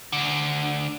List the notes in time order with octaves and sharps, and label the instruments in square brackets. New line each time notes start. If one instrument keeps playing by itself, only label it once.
[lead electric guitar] D2 D3